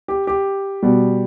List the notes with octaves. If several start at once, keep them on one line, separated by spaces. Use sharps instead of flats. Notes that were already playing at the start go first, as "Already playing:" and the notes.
G4
G4
B2 G3